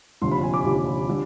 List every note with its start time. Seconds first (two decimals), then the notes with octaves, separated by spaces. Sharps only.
0.22 F1 D#2 D3 F3 C6
0.31 B5
0.43 G#5
0.54 D6
0.64 F1 D#2 D3 F3
1.09 D3